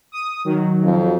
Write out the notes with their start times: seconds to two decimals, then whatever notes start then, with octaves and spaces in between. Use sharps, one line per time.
0.12 D#6
0.45 D#3 F#3
0.83 F2